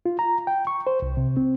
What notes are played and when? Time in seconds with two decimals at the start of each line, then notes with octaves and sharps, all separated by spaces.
0.06 F4
0.19 A#5
0.47 G5
0.67 C#6
0.87 C5
1.02 C2
1.17 C3
1.37 C4